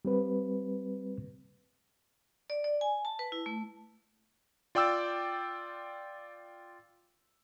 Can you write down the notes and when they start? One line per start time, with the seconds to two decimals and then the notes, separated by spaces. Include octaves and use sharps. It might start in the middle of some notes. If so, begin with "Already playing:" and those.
0.05 G3 C4 B4
2.50 D5
2.64 D5
2.81 G#5
3.05 A5
3.19 B4
3.32 E4
3.46 A3
4.75 F4 D5 G5 D6 E6